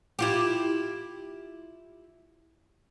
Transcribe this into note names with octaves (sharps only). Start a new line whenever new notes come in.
E4 F4 G4